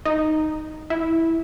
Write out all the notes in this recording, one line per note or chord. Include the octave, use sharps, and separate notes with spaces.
D#4
E4